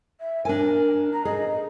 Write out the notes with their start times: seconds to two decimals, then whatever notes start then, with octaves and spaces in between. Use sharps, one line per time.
0.20 E5
0.45 D4 A#4 G#5
1.13 A#5
1.25 G#4 D#5